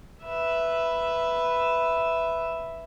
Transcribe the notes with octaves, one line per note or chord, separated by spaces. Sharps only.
B4 E5